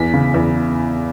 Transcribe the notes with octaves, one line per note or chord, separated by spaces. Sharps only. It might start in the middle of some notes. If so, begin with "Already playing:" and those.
Already playing: E2 B6
C#3
E2